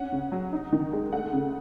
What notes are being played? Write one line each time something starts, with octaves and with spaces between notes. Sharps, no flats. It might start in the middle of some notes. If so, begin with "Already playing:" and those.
Already playing: C#4 F#5
C#3
F#3
D#4
D#3
G#3
A3 F#5
C#3